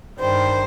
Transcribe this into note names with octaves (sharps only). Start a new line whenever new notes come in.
G2 D#3 G3 C5